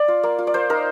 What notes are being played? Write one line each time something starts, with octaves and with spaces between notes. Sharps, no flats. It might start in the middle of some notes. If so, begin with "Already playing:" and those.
Already playing: D5
F4
A#3
F4
D5
A#3 C5
D#4 A#4